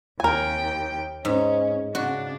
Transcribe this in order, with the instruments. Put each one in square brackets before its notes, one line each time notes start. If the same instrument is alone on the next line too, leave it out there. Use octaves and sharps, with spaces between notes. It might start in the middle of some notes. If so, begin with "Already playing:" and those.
[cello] D#2 G5 [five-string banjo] A#4 G#5
[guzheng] G#2 [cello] C#4
[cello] C#3 D4 [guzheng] F#4